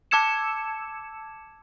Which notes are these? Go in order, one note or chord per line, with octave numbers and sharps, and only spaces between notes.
A5 D6 E6 G#6 C#7 E7